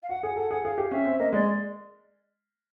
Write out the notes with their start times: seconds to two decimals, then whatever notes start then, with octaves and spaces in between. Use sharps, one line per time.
0.02 F5
0.09 F#4 F#5
0.23 G#4 F#5
0.36 A4 F#5
0.50 G#4 F#5
0.64 G#4 F5
0.78 G4
0.91 C#4 E5
1.05 C4
1.19 A#3 D#5
1.33 G#3 D5